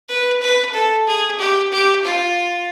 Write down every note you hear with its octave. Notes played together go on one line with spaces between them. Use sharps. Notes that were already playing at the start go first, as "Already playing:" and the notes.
B4
B4
A4
G#4
G4
G4
F4